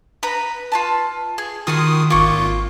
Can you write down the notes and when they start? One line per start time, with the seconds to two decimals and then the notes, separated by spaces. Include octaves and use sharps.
0.23 B4 A#5 B5
0.72 F4 B4 A5
1.38 G#4
1.67 D#3 F4 F#4 C6 D#6
2.10 G#1 A#3 F4 C#6